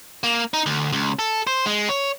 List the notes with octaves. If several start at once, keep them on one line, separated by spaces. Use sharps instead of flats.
A#3
D#4
D2
C#2
A4
C5
G#3
C#5